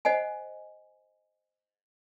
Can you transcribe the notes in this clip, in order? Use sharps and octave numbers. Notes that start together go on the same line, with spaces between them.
C5 D#5 F#5 G#5